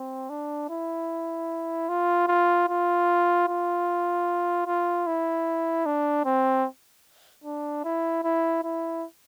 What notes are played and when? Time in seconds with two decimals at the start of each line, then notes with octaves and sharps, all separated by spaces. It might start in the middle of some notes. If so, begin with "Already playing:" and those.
Already playing: C4
0.29 D4
0.69 E4
1.89 F4
2.28 F4
2.68 F4
3.48 F4
4.67 F4
5.07 E4
5.86 D4
6.25 C4
7.44 D4
7.84 E4
8.23 E4
8.64 E4